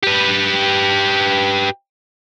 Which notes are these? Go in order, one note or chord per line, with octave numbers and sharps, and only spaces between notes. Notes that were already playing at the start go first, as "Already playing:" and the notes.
G4 B4